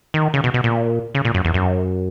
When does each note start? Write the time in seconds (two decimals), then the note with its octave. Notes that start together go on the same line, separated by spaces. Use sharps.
0.14 D#3
0.34 C#3
0.44 B2
0.54 B2
0.64 A#2
1.15 C#3
1.25 A#2
1.34 F#2
1.45 E2
1.54 F#2